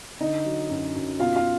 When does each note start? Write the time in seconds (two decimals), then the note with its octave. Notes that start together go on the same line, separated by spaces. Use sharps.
0.20 D3 D#4 D#5
0.45 F#3
0.70 F#2
0.95 F#2
1.20 B2 F4 F5
1.36 F4 F5